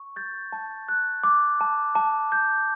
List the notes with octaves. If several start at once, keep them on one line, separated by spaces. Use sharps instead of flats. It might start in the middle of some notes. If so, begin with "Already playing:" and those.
Already playing: C#6
G6 A6
A5
F#6
D6
A5
A5
G6